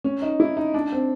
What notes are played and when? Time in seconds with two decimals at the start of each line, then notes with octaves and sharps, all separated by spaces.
0.04 C#4
0.22 D#4
0.40 E4
0.57 D#4
0.74 D4
0.92 C4